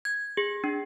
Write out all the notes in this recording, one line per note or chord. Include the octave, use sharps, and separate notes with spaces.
G#6
G#4
D4